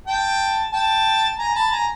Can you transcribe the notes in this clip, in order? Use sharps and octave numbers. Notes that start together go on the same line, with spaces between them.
G5 A5
G5 A5
G#5 A#5
A5 B5
G#5 A#5